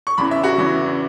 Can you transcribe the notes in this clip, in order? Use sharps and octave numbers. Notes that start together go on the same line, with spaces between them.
C#6
E2 C#3 E3 B5
E5
F#4
E2 C#3 E3